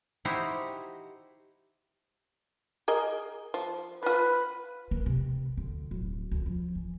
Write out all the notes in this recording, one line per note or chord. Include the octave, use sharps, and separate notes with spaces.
D#4 E4 F#4 G4 C5
G#4 A#4 D#5
F3
F3 F4 B4
A#3
C3
D2
D1
D2
F3
E3